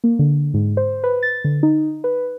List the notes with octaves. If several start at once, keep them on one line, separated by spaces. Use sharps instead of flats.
A#3
D3
G#2
C5
B4
A6
D3
D#4
B4